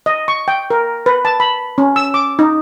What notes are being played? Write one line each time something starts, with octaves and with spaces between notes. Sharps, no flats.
D#5
C#6
G5
A#4
B4
A5
B5
C#4
E6
D6
D#4